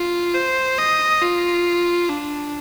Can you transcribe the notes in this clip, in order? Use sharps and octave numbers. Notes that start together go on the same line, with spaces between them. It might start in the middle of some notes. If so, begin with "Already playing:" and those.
Already playing: F4
C5
D#5
F4
D4